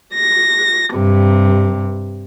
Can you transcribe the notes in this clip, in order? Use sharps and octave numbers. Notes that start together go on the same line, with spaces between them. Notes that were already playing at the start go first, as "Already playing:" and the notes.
A#6
G2 C3